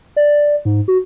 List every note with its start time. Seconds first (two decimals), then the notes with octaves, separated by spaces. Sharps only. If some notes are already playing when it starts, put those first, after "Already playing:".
0.16 D5
0.65 G#2
0.88 F#4